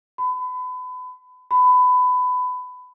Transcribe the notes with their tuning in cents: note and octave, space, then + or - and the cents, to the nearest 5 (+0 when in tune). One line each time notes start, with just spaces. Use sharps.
B5 +30
B5 +20